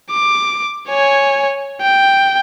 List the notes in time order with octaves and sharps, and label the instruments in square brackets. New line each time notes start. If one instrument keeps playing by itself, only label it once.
[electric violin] D6
C#5 G#5
G5